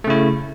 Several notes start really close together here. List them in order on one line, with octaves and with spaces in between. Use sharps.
A3 C#3 E4